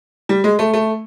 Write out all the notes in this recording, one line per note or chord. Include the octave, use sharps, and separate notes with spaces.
G3
G#3
A3
A3